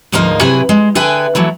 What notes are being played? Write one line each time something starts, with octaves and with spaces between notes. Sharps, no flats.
D2 G#2 F3 A#3 D#4 A#4
C3 F#3 E4 G#4 B4 G#5
G#3
D3 G#4 B4 E5 G5 G#5
E3 F#3 A3 E4